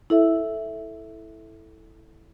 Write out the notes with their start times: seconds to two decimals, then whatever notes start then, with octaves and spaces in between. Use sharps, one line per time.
0.10 E4 A4 E5